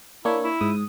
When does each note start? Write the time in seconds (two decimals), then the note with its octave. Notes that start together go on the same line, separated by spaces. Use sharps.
0.25 A#3 D4 E4 C#5
0.44 E4
0.61 G#2 D#6